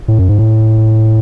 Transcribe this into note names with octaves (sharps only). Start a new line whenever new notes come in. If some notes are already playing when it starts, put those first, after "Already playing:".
A2
F#2
G#2
A2